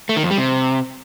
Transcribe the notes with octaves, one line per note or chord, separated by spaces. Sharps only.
A3
D#3
F2
G3
C3